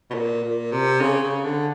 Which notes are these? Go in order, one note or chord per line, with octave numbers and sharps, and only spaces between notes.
B2
A#2
A#2
C3
C#3
C#3
D3